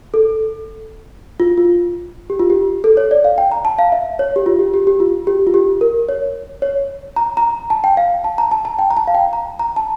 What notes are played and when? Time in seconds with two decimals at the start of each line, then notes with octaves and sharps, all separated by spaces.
0.14 A4
1.40 F4
1.58 F4
2.30 G4
2.39 F4
2.50 G4
2.84 A4
2.97 C#5
3.11 D5
3.25 F5
3.38 G5
3.52 A#5
3.65 A5
3.79 F5
3.92 E5
4.19 C#5
4.36 G4
4.46 F4
4.59 G4
4.74 G4
4.87 G4
5.00 F4
5.27 G4
5.47 F4
5.54 G4
5.81 A#4
6.09 C#5
6.62 C#5
7.16 A#5
7.37 A#5
7.70 A5
7.84 G5
7.97 F5
8.24 A5
8.38 A#5
8.51 A5
8.65 A5
8.79 G5
8.91 A#5
8.97 A5
9.08 F5
9.15 G5
9.33 A#5
9.59 A#5
9.76 A5